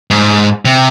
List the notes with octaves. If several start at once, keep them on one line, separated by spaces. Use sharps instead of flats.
G#2
C3